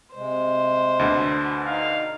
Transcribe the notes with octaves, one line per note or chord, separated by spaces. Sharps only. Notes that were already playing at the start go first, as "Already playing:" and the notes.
C3 G#3 C5
D2 B2 D3
D#4 F5